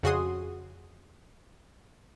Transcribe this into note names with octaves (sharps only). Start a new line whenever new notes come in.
F2 C#3 F#4 G#4 C6 D#6